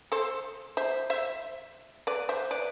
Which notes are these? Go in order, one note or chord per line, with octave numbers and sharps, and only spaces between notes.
A4 C5
C5 E5
C5 E5
B4 D5
C5 E5
B4 D5